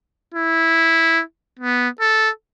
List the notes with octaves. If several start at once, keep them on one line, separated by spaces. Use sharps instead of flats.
E4
B3
A4